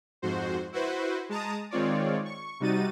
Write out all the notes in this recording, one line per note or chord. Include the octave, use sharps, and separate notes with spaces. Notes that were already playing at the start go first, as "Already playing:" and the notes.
F2 G#2 F#4 C5
E4 F#4 B4 C5
G#3 A5 A#5 D#6
D#3 G#3 C4 F4 C#5 D5
C#6
C3 G3 D#4 F#4 A6 D#7